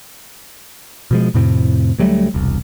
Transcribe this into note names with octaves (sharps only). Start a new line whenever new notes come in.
B2 F3 G#3
F2 A2 C3
D2 F#3 G3 A3
E1 C2